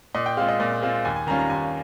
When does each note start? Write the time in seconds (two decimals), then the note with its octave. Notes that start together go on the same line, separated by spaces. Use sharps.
0.15 A#2 D#5
0.26 G5
0.37 G#3 C4 F4 F5
0.49 D#5
0.60 A#2
0.83 G#3 C4 F4
1.05 D#2 G#5
1.16 G#5
1.27 D#3 G3 C#4 F4 A#5
1.39 A#5
1.50 D#2 G#5